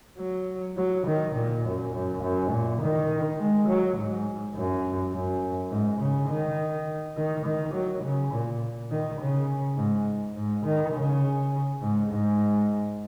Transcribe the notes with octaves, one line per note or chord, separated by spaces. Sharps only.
F#3
F#3
D#3
A#2
F#2
F#2
F#2
A#2
D#3
G#3
F#3
G#2
F#2
F#2
G#2
C#3
D#3
D#3
D#3
F#3
C#3
A#2
D#3
C#3
G#2
G#2
D#3
C#3
G#2
G#2